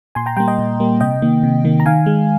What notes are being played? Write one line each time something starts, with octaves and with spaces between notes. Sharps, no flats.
A#2 G#5 C6
G5 A#5
G3 A#3 G5 A#5
D#5 G5
A#2
G3 A#3
C3 D#5 G5
D#3 A#3
C3
D#3 A#3
A#5
D#3 F5 G#5
G#3